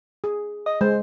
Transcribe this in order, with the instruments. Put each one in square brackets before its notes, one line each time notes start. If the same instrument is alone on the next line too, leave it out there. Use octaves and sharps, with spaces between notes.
[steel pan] G#4
[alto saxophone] D#5
[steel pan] G#3 [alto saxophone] C5